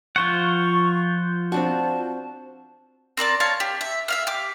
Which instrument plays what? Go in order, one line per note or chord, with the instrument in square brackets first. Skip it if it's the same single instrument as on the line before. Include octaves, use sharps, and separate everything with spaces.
[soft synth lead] F3 [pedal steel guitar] F4 C5 F#5 [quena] C#6
[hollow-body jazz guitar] C4 D4 F#4 [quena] A5
[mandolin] C4 A#4 D5 A5
C#5 F5 A5
G4
E5
E5 F5 F6
G4 D6